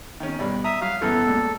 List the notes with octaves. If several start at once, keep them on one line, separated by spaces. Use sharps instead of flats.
D#3 C#4
B1 G2 D5
E5 A#5 D#6
F#3 F5
F#2 E3 B3 A4
C#2 A#2